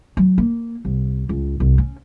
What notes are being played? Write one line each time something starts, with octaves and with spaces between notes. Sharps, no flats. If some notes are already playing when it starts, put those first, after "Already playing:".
F#3
A#3
C2
C#2
C2
C#4